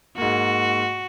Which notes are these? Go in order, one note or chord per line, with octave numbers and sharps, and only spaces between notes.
G#2 A#3 F#4